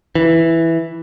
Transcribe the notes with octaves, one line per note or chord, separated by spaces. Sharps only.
E3